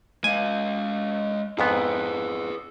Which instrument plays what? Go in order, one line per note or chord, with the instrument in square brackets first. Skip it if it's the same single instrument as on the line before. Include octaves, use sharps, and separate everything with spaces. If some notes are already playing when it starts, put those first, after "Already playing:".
[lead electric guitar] G#3 F5 [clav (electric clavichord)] G#5
[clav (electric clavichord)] F2 G#2 B3 [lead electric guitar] G#4 B4